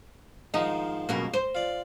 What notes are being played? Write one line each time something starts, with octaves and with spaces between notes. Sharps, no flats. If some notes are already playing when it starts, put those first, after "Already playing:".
G#2 D#3 F3 D#4
F#2 B2 A#3
C5
F4 D5